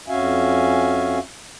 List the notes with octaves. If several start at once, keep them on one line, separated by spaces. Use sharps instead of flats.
F2 C#4 F#4 E5 F5 G#5